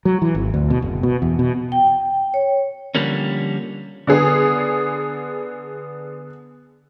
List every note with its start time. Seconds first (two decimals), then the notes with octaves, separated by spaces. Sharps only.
0.05 F#3
0.22 E3
0.35 G#1
0.54 D2
0.70 B2
0.82 F#1
1.03 B2
1.22 E2
1.39 B2
1.72 G5
1.87 G5
2.34 C#5
2.95 D3 F3 G3 A#3 C#4
4.07 D3 B3 G#4